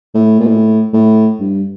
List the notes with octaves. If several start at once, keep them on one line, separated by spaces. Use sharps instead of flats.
A2
A#2
A2
A2
G2